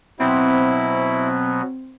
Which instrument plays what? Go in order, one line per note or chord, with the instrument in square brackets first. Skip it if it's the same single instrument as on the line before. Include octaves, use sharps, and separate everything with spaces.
[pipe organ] B2 F#3 B3 [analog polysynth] C4 [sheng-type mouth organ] E4